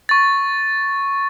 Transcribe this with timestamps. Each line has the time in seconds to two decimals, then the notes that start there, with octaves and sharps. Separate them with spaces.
0.09 C#6 A6